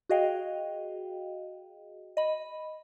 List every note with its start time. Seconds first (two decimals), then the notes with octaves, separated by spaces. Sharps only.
0.09 F#4 G#4 D#5 F5 G5
2.17 D#5 B5